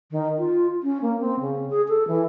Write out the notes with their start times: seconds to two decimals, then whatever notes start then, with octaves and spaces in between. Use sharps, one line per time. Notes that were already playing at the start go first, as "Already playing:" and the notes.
0.11 D#3
0.39 F4
0.83 C#4
1.02 A#3
1.20 C4
1.40 C#3
1.70 G#4
1.89 A4
2.08 E3